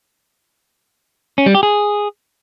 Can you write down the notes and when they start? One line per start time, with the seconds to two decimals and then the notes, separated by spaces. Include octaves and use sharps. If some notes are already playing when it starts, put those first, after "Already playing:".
1.38 C#4
1.46 G3
1.55 G4
1.63 G#4